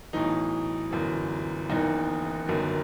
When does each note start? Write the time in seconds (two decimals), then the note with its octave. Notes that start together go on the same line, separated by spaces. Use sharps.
0.13 B1 A2 E3 D#4
0.91 G1 F#2 E3
1.69 F#1 E2 D#3 D#4
2.48 G1 F#2 D#3